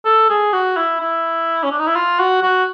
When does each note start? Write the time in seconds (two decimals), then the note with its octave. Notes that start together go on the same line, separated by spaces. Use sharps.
0.05 A4
0.30 G#4
0.53 F#4
0.77 E4
1.01 E4
1.63 C#4
1.71 D4
1.79 D#4
1.87 E4
1.96 F4
2.20 F#4
2.43 F#4